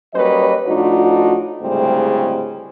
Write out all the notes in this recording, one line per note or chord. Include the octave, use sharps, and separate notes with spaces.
F#3 G3 A#3 C#4 B4 D#5
A2 F3 D4 D#4 F#4
D2 A2 C#3 G3 G#3 C4